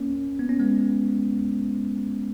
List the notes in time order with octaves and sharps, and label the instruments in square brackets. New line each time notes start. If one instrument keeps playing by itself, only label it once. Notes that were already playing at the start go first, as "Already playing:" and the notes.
Already playing: [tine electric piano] A#3 C#4
B3
C#4
G#3 B3